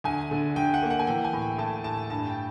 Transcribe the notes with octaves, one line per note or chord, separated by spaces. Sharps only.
D2 G#5
D3
D2 G5
F#5
A#3
F#5
G#5
E3 G5
G#5
A2
G5
A2 A5
A2 A5
G2 A5
G5